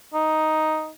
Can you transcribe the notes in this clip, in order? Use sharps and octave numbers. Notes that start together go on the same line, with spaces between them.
D#4